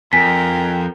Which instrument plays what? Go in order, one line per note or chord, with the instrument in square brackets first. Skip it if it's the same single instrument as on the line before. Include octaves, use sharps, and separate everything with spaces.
[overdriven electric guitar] F2 [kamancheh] A#4 G5 [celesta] G#5 B6